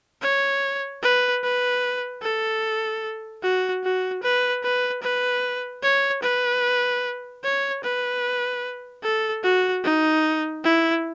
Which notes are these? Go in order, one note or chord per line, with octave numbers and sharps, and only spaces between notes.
C#5
B4
B4
A4
F#4
F#4
B4
B4
B4
C#5
B4
C#5
B4
A4
F#4
D#4
E4